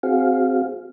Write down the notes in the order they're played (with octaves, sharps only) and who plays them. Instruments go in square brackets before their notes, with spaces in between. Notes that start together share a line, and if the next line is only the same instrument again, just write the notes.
[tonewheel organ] C4 F#4 G#4 F5